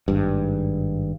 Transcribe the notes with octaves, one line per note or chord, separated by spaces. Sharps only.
G#1 G2